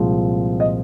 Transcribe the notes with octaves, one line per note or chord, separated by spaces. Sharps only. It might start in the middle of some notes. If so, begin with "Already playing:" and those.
Already playing: C2 A#2 F3 G#3 C4
D#5